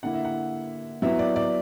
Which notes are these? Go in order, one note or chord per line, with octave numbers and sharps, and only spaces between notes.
D3 A#3 E4 F#5
E5
F#5
F#3 B3 E4 E5
D5
D5